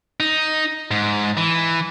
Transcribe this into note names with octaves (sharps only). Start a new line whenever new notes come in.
D#4
G#2
E3